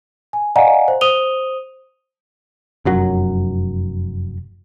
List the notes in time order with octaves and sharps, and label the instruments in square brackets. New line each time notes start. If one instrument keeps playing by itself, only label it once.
[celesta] G#5
D5 D#5 F5 F#5 G#5 A#5
C5
C5 D#6 D#7 F7 G7
[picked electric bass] F1 F#2 F#3